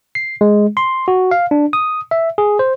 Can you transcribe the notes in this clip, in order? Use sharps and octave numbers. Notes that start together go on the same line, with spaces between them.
C7
G#3
C6
F#4
F5
D4
D#6
E5
G#4
C5